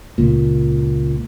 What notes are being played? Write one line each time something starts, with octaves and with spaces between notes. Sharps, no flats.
C#2 A#2